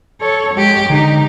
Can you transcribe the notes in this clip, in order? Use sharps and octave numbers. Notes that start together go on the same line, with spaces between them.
A4 C#5
G#3 G4
D3 D#4 G4